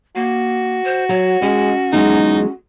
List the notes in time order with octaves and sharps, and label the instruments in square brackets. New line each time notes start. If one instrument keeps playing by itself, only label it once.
[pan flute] A#3 [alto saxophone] F#4
[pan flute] C5
[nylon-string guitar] F#3 [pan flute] C#5
[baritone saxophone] G#3 [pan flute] C#4 [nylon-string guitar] D#5
[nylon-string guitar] E2 F#3 G#3 [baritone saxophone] D#4